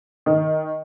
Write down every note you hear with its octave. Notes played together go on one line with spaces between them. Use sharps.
D#3